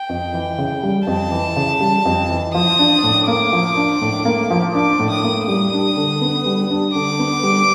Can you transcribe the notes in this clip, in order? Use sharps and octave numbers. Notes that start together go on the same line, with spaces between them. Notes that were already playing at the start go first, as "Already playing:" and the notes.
Already playing: G5
F2
E3
C#3
G3
F2 A5
E3
C#3
G3
F2
E3
F3 D#6
D4
A2
A#3 D6
F3
D4
A2
A#3
F3
D4 D6
A2
D#6
A#3
G3 D#6
D4
D3
B3
G3
D4
D3 D6
B3
G3